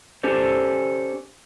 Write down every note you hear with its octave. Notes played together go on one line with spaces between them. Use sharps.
C#4 G4 A4 C5 D5